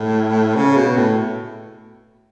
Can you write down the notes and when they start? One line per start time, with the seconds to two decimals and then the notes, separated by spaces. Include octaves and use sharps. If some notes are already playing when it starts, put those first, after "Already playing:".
Already playing: A2
0.56 C#3
0.77 B2
0.97 A2